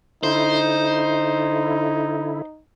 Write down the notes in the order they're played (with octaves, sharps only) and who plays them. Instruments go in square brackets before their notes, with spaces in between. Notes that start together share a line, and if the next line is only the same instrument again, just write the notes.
[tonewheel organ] D3 E4 [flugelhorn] D#4 [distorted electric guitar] C5